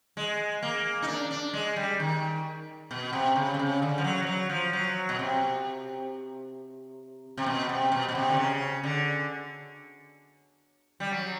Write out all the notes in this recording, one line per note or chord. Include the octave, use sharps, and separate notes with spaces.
G#3
A#3
D#4
D4
D4
G#3
G3
D#3
B2
C3
C#3
C3
C#3
D3
F3
F#3
F3
F#3
F3
F#3
B2
C3
C3
B2
C3
B2
B2
C3
D3
C#3
D3
G3
F#3